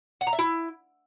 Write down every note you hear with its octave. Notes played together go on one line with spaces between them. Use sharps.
F#5
A#5
E5
E4